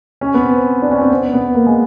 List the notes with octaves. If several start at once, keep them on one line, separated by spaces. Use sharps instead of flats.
C#4
B3
C4
D4
C#4
C4
B3
B3
A#3
G#3